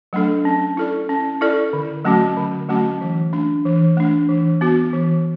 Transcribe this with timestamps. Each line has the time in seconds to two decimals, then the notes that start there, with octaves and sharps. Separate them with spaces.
0.13 F#3 A3 D4 A4
0.45 C#4
0.77 E4 A4 D5
1.09 C#4
1.41 E4 A4 D5
1.73 D3
2.05 F#3 A3 C#4 F#4
2.37 D3
2.69 F#3 A3 C#4 F#4
3.01 E3
3.33 A3 D4
3.65 E3
3.97 A3 D4
4.29 E3
4.61 B3 F#4
4.93 E3